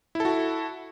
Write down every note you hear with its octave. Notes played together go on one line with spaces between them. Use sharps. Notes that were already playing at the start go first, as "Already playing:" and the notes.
E4 F#4 A4